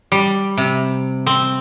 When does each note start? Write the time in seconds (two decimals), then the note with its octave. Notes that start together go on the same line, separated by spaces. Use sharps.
0.12 G3
0.57 C3
1.27 C4